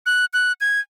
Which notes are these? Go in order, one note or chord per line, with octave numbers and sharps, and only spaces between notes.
F#6
F#6
G#6